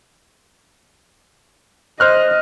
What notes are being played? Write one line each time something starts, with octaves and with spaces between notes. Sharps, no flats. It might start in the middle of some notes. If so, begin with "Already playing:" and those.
C5 D#5 F6 F#6